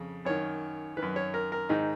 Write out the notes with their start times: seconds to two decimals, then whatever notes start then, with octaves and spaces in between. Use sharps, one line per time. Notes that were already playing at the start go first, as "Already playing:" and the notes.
Already playing: F2 C#3
0.25 F#2 D#3 C#5
0.97 D#3 B4
1.02 F#2
1.16 C#5
1.34 A#4
1.52 A#4
1.69 G#2 D#3 D#4